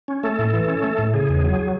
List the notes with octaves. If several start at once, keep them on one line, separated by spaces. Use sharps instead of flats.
C#4
A3 A4
A2
E3
C#4
A3
A2
C#3 G#4
E2
F#3